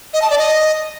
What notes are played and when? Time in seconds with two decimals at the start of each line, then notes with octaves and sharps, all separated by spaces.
0.14 D#5
0.22 A5
0.30 D5
0.38 D#5